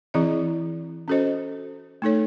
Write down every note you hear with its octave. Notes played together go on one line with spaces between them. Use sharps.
E3 C4 E4 G#4 D#5
C#4 F#4 A4 C5 D#5
A3 D#4 A4 C#5